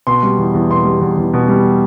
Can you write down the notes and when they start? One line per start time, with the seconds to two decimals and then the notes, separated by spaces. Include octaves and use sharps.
0.07 B2 C6
0.23 G3
0.38 E2
0.54 E2
0.70 B2 C6
0.85 G3
1.01 E2
1.18 E2
1.34 B2
1.48 G3